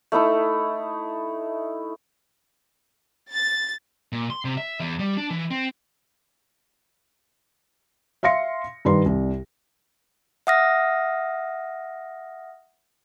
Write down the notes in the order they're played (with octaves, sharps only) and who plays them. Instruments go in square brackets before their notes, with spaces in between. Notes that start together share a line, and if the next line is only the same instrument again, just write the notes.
[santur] A3 D#4 E4 A4
[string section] A6
[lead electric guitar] A#2
C6
C3
E5
E2
G3
D4
E3
C4
[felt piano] E5 F5 C6 A#6 C#7
G2 D#3 B4 C6
C2
[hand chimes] E5 F#5 D#6 F6 A#6